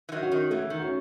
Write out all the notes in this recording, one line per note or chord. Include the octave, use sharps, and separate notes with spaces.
E3
D#3 F#3
C#4 F#4
D#3
C#3 E3 A3
D#3
C#4 F#4